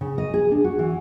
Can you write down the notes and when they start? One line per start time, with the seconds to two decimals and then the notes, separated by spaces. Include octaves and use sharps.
0.01 C#3
0.18 D#5
0.34 G#4
0.51 D4
0.64 F#4
0.79 E3